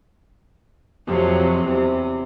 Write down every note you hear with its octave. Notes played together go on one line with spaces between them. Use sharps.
F2 C3 F3 F#3
E2 C3